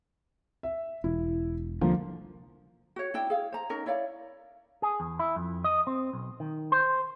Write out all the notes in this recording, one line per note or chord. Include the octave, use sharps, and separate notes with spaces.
E5
E1 E4
C2 D3 F3 A#3 F4
F#4 C#5
D4 E4 G5
G#4 F5
C5 A#5
C#4 D#4 A#4
E4 C#5 D5 F5
G#4
E2
E4
F2
D#5
C4
B1
D#3
C5